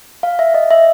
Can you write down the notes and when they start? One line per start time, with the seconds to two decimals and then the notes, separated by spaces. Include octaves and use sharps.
0.23 F5
0.39 E5
0.54 D#5
0.70 E5